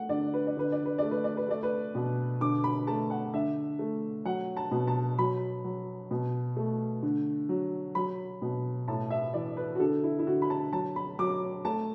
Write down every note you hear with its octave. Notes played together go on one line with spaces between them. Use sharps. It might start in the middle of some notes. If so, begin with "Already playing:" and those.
Already playing: A3 F#5
D3 D5
B4
D5
D3 B4
D5
B4
A3 D5
B4
D5
B4
A3 D5
B4
B2
D3 D6
B5
A3 A5
F#5
D3 E5
A3
F#3 F#5
A5
B2
A5
F#3 B5
F#3
B2
A3
D3
F#3
F#3 B5
B2
A2 A5
E5
E3 D5
B4
F#4
D3 A4
E4
E4
D3 F#4
B5
A5
F#3 A5
B5
F#3 D6
A3 A5